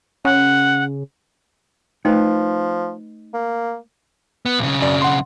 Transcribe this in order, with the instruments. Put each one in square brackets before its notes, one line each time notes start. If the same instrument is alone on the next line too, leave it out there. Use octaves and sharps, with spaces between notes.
[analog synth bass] C#3 [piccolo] F#5
[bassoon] F3 [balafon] A3 [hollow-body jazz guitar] D#4 B4 F5
[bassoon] A#3
[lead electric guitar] B3
B1 C#3
[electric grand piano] F#2 D5
F#5 C6